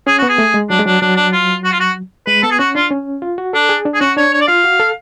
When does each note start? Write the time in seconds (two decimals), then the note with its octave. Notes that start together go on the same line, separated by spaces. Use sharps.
0.07 C#4 G#4
0.18 B3 F#4
0.29 G#4
0.38 A3
0.54 G#3
0.70 F#3 D4
0.79 G#3
0.86 F#3 D4
1.01 F#3 D4
1.17 D4
1.32 F4
1.65 F#4
1.72 F4
1.80 F#4
2.27 G#3 B4
2.43 B3 A4
2.51 G#4
2.59 C#4 F#4
2.75 D4 F4
2.91 C#4
3.22 F4
3.38 F#4
3.53 D4 A4
3.69 G#4
3.85 D4
3.94 G#4
4.01 C#4 F#4
4.17 D4 C#5
4.33 C#5
4.41 D5
4.48 F4 F5
4.64 F#4
4.80 A4